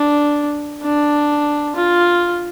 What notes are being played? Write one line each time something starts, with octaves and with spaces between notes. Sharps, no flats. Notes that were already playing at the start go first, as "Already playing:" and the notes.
Already playing: D4
D4
F4